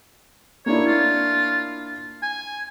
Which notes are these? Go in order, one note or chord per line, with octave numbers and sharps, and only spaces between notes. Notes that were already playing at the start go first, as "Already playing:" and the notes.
A#3 D4 E4 C#5
F4
G#5